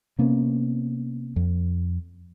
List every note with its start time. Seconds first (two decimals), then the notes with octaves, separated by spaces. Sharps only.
0.19 C3 A#3 B3 C#4
1.36 F2